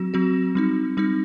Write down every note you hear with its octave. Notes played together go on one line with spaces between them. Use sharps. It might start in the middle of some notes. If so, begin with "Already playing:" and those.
Already playing: F#3 C4 F#4
F#3 C4 F#4
G3 C4 D#4
G3 C4 D#4